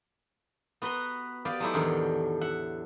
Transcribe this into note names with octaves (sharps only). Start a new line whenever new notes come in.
B3 F#4 B4 A#5 C6
B3 G4 D5 F5
F#3 G#3 A3 D#4 E4 G4
E2 A2 D3 D#3
E5 F#5